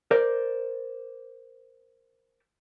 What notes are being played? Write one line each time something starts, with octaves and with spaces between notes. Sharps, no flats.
A#4 C5 D5